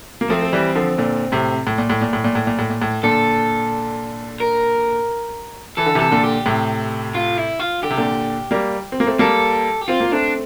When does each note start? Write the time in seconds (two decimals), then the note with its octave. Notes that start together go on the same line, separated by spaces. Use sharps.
0.21 A#3
0.30 F3 A3 C4
0.42 A3
0.53 E3 G3
0.75 D3 F3
0.98 A#2 D3
1.32 A2 C3
1.67 A2
1.78 A#2
1.90 A2
2.02 A#2
2.13 A2
2.24 A#2
2.35 A2
2.47 A#2
2.59 A2
2.70 A#2
2.82 A2
3.03 A#2 D3 A4
4.40 A#4
5.77 E3 A4
5.86 D3
5.95 C3 E3 A4
6.11 A#2 D3
6.23 G4
6.46 A2 C3
7.15 F4
7.37 E4
7.60 F4
7.83 D3 G4
7.90 C3
7.97 A#2 D3
8.51 G3 A#3
8.92 C4
9.00 A#3
9.07 A3 C4
9.19 G3 A#3 A4
9.81 G4
9.88 C4 F4
10.00 A#3
10.12 A3 C4 D4